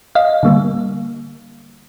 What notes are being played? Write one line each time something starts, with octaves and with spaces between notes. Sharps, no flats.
D#5 F5
D3 G3 A#3